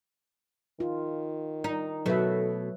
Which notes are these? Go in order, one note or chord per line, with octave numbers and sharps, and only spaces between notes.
D#3 F4
D#4
B2 F#3 A3 B4 E5